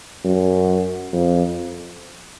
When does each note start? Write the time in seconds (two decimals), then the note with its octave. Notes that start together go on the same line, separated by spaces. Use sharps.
0.24 F#2
1.12 F2